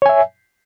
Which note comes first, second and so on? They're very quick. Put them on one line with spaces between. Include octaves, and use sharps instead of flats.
C#5 G#5 E5